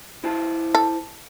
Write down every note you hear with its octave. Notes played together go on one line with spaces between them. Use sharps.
E4 C5 A5
A4